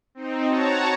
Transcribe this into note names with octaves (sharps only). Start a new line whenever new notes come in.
C4 D#4
F#4 C#5 A5 A#5